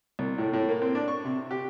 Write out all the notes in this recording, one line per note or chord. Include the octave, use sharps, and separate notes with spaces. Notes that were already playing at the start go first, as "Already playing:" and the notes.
C2
A2
A2
A#3
C4
D4
C#6
C3
G4